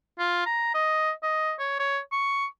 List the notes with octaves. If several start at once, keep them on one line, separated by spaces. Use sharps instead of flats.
F4
A#5
D#5
D#5
C#5
C#5
C#6